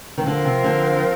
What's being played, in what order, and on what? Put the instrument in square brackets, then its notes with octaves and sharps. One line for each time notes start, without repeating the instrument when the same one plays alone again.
[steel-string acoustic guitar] D#3
[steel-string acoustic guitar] D3 [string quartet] F3 C4 F4 A#4
[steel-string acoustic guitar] C3
D3